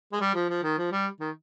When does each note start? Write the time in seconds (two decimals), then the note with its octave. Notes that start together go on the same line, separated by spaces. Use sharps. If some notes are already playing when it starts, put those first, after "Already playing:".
0.13 G#3
0.20 G3
0.35 F3
0.49 F3
0.63 D#3
0.78 F3
0.92 G3
1.20 D#3